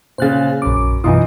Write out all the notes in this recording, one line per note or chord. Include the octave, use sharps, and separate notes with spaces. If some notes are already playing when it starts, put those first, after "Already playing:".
A#2 C#3 C5 F#6 A6
A#1 F#2 D6
F#2 B2 E3 D#4 F4 D#6